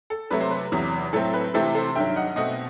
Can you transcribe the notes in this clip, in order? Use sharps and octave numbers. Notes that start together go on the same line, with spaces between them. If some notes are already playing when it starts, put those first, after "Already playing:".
A4
C3 F#3 A3 B4
C5
B4
E2 C3 F#3
A2 F#3 A3 C4 A4
B4
C3 E3 A3 C4 A4
A4 C5
G2 D#3 F#3 E5 G5
D#5 F#5
B2 A3 C4 D#5 F#5